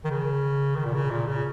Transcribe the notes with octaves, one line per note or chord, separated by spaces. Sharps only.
D#3
C#3
D#3
A#2
C#3
A#2
C#3